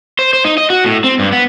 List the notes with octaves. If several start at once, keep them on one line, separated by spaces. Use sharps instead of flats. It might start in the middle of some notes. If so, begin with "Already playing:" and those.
C5
C5
D#4
D#5
F#4
A2
C4
G2
B3